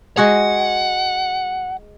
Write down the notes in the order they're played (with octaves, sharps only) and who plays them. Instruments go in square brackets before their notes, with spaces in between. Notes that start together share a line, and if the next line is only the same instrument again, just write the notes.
[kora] G#3 F#4 G#4 [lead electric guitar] F#5